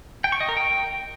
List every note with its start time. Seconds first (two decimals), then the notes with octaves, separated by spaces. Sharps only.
0.24 G5
0.32 C#6
0.40 D#5
0.49 A#4
0.57 G5